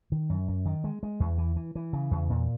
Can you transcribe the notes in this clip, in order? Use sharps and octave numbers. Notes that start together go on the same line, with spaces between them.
D#3
F#2
F#2
D#3
G#3
G#3
E2
E3
E3
E3
C#3
E2
A#2